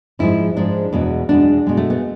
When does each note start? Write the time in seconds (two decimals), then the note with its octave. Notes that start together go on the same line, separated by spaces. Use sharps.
0.19 G#2 F3 G#3 E4
0.56 G#2 F3 G#3 D4
0.93 E2 B2 G#3
1.29 E2 B2 G#3 D4
1.67 B2 G#3
1.77 A3
1.90 B3